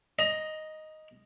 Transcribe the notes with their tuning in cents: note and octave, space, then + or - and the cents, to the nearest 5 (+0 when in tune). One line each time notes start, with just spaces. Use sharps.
D#5 +0 A#5 +25